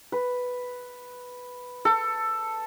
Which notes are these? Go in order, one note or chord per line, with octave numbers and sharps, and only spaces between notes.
B4
A4